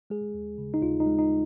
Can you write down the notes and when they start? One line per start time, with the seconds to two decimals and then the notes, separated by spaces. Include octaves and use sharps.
0.10 G#3 G#4
0.34 D#2
0.58 C#3
0.74 D#4
0.82 D#2 F4
1.00 D#4
1.07 G#3
1.19 D#4